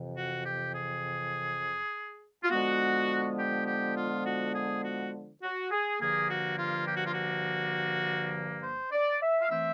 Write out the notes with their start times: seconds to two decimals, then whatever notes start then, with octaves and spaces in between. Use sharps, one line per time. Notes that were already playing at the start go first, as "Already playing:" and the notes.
Already playing: F2 C3 E3
0.17 F#4
0.45 G4
0.74 G#4
2.43 F4
2.50 D3 F3 G#3 B3 F#4
3.37 G4
3.66 G4
3.95 F4
4.25 F#4
4.55 G#4
4.84 F#4
5.42 F#4
5.71 G#4
6.00 G2 D3 F3 A#3 G#4
6.29 F#4
6.59 F4
6.88 G4
6.97 F#4
7.06 F4
7.14 F#4
8.63 C5
8.92 D5
9.22 E5
9.41 F5
9.50 E3 A3 C4 E5